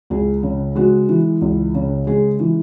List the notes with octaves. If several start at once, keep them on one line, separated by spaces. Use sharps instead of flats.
C#2 G#4
C#3
G#3 F#4
E3
C#2
C#3
G#3 G#4
E3